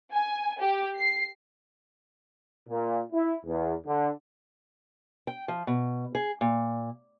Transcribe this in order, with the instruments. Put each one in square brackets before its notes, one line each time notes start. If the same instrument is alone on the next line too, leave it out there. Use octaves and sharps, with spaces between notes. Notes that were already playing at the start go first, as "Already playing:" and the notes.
[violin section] G#5
G4
C7
[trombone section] A#2
E4
E2
D3
[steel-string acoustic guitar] G5
F3
B2
G#4
A#2